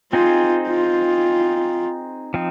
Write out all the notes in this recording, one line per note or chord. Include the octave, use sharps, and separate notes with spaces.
C4 D#4 F4 G#4 C5
F4
F3 C4 D#4